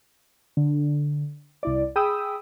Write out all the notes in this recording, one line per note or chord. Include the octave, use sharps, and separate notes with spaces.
D3
C2 E4 D5
G#4 G5 B5 D#6 E6